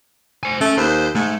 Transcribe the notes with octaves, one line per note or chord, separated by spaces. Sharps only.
C5 G#5
A3 C#4
D#2 C5
G#2 A3